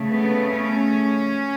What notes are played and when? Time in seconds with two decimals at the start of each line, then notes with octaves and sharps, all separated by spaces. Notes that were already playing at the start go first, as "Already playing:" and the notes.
Already playing: C#3 A3
0.13 B3
0.51 C#4